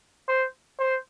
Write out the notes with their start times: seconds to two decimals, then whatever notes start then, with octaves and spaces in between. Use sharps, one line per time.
0.28 C5
0.80 C5